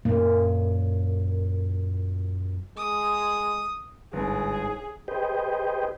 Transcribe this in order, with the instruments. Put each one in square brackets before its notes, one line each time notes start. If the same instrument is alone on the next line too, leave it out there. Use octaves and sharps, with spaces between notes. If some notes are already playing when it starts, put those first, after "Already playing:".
[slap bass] F#2 A#2 [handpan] A#3
[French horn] G#3 [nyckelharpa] D#6
[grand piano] G1 G#2 [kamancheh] G#4
[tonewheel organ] G4 G#4 B4 C5 D#5 G5